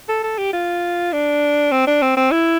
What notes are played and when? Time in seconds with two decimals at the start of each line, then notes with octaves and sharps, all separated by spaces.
0.09 A4
0.23 A4
0.38 G4
0.53 F4
1.12 D4
1.72 C4
1.87 D4
2.02 C4
2.17 C4
2.31 E4